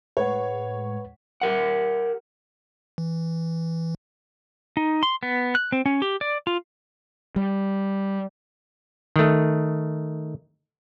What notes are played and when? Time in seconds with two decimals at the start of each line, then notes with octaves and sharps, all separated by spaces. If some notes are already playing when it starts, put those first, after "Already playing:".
0.17 A2 G#3 B4 C#5 F#5 G#6
1.41 G4 A#4 F#5
2.98 E3
4.77 D#4
5.03 C6
5.23 B3
5.55 F#6
5.72 C4
5.86 C#4
6.02 G4
6.21 D5
6.47 F4
7.36 G3
9.16 D#3 A3